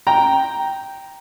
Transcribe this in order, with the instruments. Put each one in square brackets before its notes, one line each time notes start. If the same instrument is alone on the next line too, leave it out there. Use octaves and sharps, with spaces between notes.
[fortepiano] G5 A#5